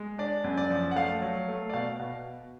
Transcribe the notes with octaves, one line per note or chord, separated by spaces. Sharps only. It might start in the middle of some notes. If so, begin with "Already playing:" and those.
Already playing: G#3
D4 D5
F#2
D5
F3
F#5
A3 F5
F#3
A3
D5
B2 F5
B2